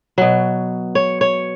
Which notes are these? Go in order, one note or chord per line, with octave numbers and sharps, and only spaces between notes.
B2 F#3
C#5
C#5